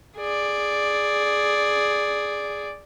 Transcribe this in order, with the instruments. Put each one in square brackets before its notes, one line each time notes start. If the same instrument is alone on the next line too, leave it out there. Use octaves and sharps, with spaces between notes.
[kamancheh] G#4 D5